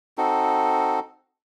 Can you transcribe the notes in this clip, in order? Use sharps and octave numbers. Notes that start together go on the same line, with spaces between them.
C4 D#4 F#4 A4